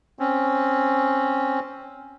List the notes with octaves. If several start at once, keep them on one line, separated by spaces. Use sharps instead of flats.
C4 C#4